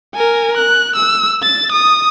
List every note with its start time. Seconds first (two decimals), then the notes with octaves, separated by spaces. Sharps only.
0.15 A#4 G#5
0.57 F#6
0.96 E6
1.43 A6
1.72 D#6